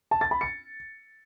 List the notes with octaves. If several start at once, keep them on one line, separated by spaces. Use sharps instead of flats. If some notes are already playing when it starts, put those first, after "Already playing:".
A5
A6
B5
C#7